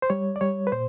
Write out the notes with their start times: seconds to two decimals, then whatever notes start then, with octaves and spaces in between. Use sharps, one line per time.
0.02 C5
0.10 G3 C#5
0.36 D5
0.41 G3 C#5
0.67 B4
0.72 A#2 C5